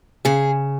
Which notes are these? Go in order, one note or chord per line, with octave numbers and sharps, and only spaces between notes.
C#3 G#4